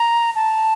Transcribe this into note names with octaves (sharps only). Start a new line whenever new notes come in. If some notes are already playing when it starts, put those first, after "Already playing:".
Already playing: A#5
A5